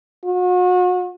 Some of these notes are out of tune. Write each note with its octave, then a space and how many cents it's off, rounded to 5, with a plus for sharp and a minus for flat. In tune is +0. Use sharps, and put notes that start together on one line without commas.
F#4 -40